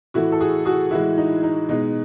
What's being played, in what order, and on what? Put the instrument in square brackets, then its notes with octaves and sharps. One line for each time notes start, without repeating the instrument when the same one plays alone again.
[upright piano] A2 E3 A3 E4 F#4
A4
F#4 G#4
F#4 G#4
A2 E3 G#3 E4 F#4
D#4
D#4
B2 G#3 D#4